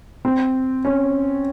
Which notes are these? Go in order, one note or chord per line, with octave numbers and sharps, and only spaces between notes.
C4
C#4